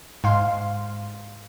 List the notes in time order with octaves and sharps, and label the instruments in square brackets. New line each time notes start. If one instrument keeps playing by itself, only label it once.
[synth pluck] G#2 F5 C6